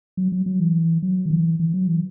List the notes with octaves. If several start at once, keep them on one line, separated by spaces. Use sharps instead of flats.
F#3
F#3
F#3
E3
F#3
D#3
E3
E3
F#3
E3